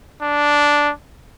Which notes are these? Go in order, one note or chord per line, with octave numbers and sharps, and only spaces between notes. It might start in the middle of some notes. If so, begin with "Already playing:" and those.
D4